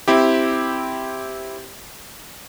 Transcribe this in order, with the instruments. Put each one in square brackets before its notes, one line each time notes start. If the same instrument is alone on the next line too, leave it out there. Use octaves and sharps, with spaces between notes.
[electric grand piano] C4 E4 G4